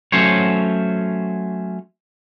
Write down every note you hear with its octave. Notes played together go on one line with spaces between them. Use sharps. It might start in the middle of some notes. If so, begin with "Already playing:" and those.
F#3 A3 C#4 C5 C#5